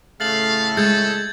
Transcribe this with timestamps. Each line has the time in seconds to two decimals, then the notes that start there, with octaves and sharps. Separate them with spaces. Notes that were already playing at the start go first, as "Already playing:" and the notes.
0.20 A2 C#3 A3 F5 A6 F#7
0.77 G#3 A4 G6 G#6